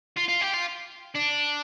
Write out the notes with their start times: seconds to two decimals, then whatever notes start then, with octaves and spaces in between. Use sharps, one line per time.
0.17 F4
0.29 F4
0.41 G4
0.54 F4
1.15 D4